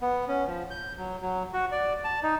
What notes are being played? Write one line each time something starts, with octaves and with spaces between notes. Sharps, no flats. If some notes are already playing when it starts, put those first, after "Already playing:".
B3
C#4
F3
G6
F#3
F#3
F#4
D5
A5
D#4